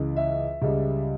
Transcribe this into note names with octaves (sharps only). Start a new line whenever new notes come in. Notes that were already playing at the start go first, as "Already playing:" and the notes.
Already playing: C#2 C#3 E3
E5
C#2 C#3 G3